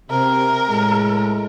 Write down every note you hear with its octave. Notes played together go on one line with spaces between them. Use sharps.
C3 A#4
A2 G#3